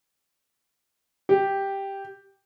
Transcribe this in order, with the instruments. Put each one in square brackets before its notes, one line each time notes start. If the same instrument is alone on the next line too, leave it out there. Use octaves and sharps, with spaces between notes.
[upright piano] G4